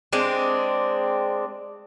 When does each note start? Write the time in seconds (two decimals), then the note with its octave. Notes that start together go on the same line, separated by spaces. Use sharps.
0.13 G#3 C4 D4